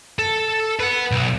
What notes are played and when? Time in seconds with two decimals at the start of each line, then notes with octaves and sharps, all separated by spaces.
0.19 A4
0.80 B4 F#5
1.11 B1